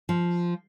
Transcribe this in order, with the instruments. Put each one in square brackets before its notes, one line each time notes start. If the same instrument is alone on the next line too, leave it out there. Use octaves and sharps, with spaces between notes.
[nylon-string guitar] F3